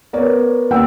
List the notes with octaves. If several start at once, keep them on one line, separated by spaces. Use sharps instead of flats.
B3 A#4 C#5 D5
D#2 F#5 G5 E6